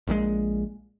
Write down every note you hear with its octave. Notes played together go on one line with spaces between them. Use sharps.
A#1 A#2 D#3 G#3